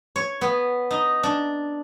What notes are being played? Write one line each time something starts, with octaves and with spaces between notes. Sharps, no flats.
C#5
B3
D#4
D4